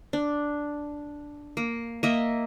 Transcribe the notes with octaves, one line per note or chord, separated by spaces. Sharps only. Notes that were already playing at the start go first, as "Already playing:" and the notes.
D4
A#3
A#3 D#5 E5